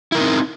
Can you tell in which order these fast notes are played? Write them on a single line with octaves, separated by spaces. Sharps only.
E4 A#4 D#4 C4